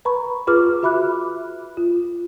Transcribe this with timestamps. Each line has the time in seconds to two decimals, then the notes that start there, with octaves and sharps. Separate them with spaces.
0.05 B4 A#5 B5 C#6
0.47 F4 G#4 B4 D6 F6
0.83 F#4 E5 B5 D6 F#6
1.77 F4